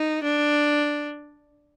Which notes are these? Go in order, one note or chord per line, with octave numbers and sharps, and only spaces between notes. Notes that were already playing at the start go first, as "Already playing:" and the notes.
Already playing: D#4
D4